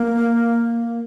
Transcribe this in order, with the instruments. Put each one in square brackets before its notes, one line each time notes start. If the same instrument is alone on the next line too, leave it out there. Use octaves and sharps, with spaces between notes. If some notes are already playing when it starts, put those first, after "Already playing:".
Already playing: [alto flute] A#3